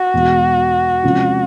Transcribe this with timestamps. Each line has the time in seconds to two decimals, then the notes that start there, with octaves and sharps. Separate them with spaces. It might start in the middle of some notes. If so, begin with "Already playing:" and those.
Already playing: F#4
0.14 E2 B2 G#3
1.03 C3 F3 G#3 C#4 F4